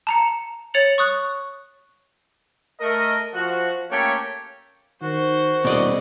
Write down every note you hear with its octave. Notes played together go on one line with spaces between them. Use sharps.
A5 A#5 C#7
C#5 A6 C#7 F7 F#7
C#6 D#6 F#6
A3 A#4 D#5
F3 F#4
A3 A#3 C#4 G4 C#5
D#3 F#4 C5
D#1 B2 D5 D#5